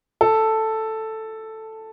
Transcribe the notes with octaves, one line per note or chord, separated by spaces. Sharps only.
A4